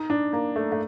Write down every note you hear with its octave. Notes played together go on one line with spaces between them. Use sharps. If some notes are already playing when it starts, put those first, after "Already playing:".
Already playing: D#4
D4
A#3
A3
A3